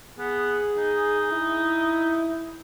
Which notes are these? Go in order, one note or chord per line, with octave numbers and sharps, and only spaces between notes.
B3 G#4
D#4
E4